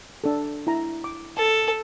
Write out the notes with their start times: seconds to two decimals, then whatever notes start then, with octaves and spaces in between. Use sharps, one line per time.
0.24 D4 A4
0.67 E4 A#5
1.04 D6
1.37 A4 A5